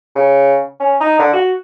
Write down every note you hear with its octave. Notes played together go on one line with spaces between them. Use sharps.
C#3
C#4
D#4
D3
F#4